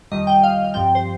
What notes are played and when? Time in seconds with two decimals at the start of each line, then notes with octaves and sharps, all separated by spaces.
0.12 F2 D#3 G3 D#5
0.27 G5
0.43 F5
0.64 F5
0.74 G2 F3 C4 G5
0.95 C5